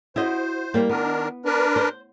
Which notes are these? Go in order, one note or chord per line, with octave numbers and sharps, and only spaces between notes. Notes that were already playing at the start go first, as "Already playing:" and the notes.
E4 F#4 C5 D#5
G3 A#3
D#3 B3 D4 A#4
D4 A#4 B4
C5